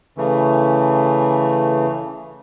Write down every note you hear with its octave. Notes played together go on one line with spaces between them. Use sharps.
C#3 E3 A3